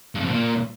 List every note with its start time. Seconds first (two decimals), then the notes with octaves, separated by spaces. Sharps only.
0.15 G2
0.20 F2
0.25 C3
0.30 A#2